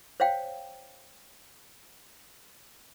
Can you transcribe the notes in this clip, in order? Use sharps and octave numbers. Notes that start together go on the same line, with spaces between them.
C5 C#5 F5 G5